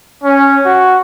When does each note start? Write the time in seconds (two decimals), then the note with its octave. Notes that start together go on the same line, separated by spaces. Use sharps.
0.24 C#4
0.66 F#4